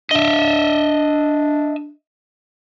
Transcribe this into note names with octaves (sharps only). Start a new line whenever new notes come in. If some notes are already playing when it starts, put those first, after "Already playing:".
D4 D#5 E5